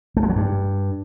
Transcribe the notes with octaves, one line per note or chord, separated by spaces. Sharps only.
A3
G#3
F#3
G2